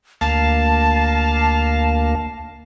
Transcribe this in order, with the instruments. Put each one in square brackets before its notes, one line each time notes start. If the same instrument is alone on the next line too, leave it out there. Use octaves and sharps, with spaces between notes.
[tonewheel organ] D2 A#3 F5 [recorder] A5